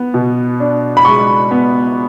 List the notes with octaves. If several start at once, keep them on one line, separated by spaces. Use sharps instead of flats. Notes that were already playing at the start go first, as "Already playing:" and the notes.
Already playing: B3
B2
D4
B5
G#3 C#6
B3